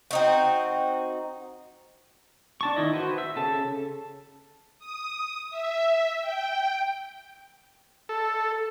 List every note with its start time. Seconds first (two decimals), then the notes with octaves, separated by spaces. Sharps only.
0.11 C4 D#4 F#4
2.61 D4 A5 C#6
2.76 D#3 E4 D#5
2.93 F#4 B4 C5
3.18 E5
3.36 C#3 A4 A5
4.79 D#6
5.50 E5
6.21 G5
8.09 A4